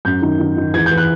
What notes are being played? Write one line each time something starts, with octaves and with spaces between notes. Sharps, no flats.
F#2 G6
D#3
D#3
D#3
E2 G#6
G6
E3
F#6